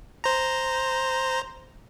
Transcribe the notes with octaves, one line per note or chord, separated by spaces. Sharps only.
C5 A#5